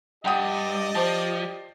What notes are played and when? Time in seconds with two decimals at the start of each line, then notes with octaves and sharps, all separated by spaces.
0.25 G2 G4 D5 D#5 F#5 G5 D#6
0.95 F3 C5 A5